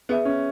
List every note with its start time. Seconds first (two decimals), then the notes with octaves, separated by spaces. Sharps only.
0.09 B3 G#4 B4 E5
0.25 C#4